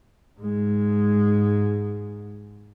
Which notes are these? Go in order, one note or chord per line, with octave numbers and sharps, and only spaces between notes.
G#2 G#3